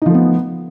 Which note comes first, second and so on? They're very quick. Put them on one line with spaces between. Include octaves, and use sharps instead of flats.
D#4 F3 A3 B3